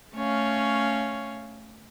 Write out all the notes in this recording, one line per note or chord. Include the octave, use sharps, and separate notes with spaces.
A3 C#4 C#5 F5